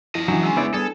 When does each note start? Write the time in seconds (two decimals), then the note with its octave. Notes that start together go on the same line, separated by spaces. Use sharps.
0.15 F3 E4 D#5
0.28 E3 F#3 C#4 D4
0.43 G#3 C#4 G#5 E6
0.57 B3 D4 E4 C#5 D5
0.74 G3 B3 G#4 A4